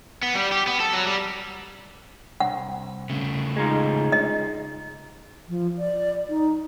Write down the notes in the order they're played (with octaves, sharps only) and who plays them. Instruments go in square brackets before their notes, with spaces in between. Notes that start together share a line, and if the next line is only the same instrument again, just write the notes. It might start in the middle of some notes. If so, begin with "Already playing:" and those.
[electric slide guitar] B3
G3
G4
B3
A4
F#3
G3
[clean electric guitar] C2 [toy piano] F#5
[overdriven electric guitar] C#3 A3
[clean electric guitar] G#3 D#4 F4
[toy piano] D#5
[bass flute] F3
D5
D#4